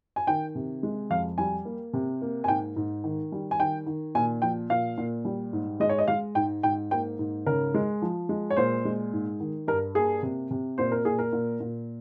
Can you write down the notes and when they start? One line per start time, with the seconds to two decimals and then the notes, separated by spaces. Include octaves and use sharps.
0.16 G#5
0.27 D#3 G5
0.55 C3
0.83 G#3
1.10 F2 F5
1.38 G3 G#5
1.65 A#3
1.93 C3
2.22 A#3
2.44 G#5
2.48 G#2 G5
2.76 G#2
3.04 D#3
3.32 G3
3.51 G#5
3.60 D#3 G5
3.86 D#3
4.15 A#2 G#5
4.42 F3 G5
4.70 A#2 F5
4.98 A#2
5.25 G3
5.53 G#2
5.80 G#3 D#5
5.89 C#5
5.98 D#5
6.08 G#3 F5
6.35 G#2 G5
6.63 G#2 G5
6.91 A#3 G5
7.19 G#2
7.46 C#3 A#4
7.74 G#3
8.02 F3
8.29 G#3
8.50 C#5
8.57 A#2 C5
8.85 G#3
9.13 G#2
9.40 D#3
9.68 G2 A#4
9.95 A#3 G#4
10.23 C3
10.51 C3
10.78 A#2 C5
10.92 A#4
11.05 A#2 G#4
11.19 A#4
11.33 A#2
11.60 A#2